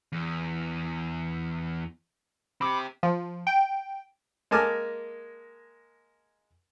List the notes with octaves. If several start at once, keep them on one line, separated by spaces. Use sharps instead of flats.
E2
C4 G4 B5 D6
F3
G5
G#3 A#3 G#5 A5 D6 F6